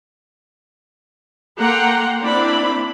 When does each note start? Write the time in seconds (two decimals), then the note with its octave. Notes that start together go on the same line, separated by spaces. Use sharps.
1.58 A#3 A4 F#5 G5 A#5 C6
2.21 A#3 C4 D4 E4 D5 B5